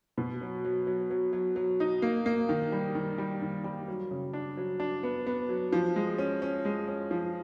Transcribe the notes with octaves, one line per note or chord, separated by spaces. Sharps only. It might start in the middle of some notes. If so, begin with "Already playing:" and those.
B2
F#3
F#3
F#3
F#3
F#3
F#3
D#4
A#3
A#3
D#3
G3
D#3
G3
D#3
G3
F#3
C#3
D4
F#3
D4
B3
B3
F#3
F3
G#3
C#4
C#4
G#3
C#4
F3